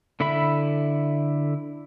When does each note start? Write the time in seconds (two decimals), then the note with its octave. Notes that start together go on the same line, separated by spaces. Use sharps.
0.20 D3 E4 A4 E5 B5